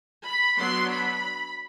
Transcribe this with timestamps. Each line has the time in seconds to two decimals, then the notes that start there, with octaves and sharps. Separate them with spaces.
0.25 B5
0.58 F#3 B3 D4 C6
0.91 B5